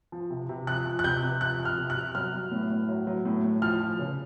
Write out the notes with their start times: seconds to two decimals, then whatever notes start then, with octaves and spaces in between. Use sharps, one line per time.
0.12 F3
0.30 C3
0.49 C3
0.67 F3 F#6
0.86 F3
0.99 F#6
1.04 C3 G6
1.23 C3
1.41 F3 F#6
1.59 F3
1.65 F6
1.78 C3
1.90 F#6
1.96 C3
2.15 F#3 F6
2.33 F#3
2.52 A2
2.71 A2
2.89 F#3
3.07 F#3
3.25 A2
3.43 A2
3.62 F3 F6
3.80 F3
3.99 C#3